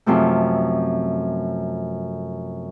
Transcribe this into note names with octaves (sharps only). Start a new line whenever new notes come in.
F#2 C3 F3 A3